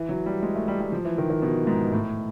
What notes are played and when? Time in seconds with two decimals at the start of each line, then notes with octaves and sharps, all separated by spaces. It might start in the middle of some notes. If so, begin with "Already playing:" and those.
Already playing: E3
0.09 F#3
0.26 G3
0.43 G#3
0.55 A3
0.68 G3
0.81 G3
0.92 F3
1.05 E3
1.18 D#3
1.30 D#3
1.42 B2
1.67 G#2
1.92 A2